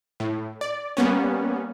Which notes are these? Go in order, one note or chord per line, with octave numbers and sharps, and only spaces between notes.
A2
D5
G3 A#3 B3 C#4